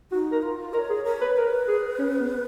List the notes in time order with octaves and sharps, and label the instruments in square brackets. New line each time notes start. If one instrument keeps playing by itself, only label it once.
[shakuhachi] D#4 [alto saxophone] F#4
[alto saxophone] A#4
[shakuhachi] F4
[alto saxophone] A#4 [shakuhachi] D#5
[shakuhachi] C#5
[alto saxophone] G#4
[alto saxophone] A#4 [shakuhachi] C#5
[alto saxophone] B4
[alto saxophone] A#4 [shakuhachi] B4
[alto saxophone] G#4
C#4
B3